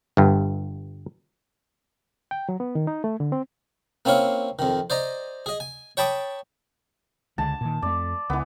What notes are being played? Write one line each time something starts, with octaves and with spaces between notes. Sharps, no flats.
G1 G2
G5
F#3
B3
D#3
D#4
A3
D3
C4
A#3 C4 C#4 E4 C#5 F5
F2 D#3
C5 D5 D#5 A#5
G#4 D#5
G#5
C#5 G5 A5 B5 D6 D#6
C#2 D3 G#3 A5
A#2 D#3
F2 A3 D5
C#2 E3 B3